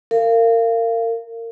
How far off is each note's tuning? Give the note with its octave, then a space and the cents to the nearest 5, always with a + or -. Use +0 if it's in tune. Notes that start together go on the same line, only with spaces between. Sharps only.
A#4 -30 F5 -25